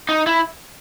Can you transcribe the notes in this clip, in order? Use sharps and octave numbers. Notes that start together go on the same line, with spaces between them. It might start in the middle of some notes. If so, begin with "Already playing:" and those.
D#4
E4